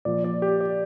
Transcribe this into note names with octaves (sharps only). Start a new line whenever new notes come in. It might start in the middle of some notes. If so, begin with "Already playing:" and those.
A#2 F3 D5
D5
G4
D5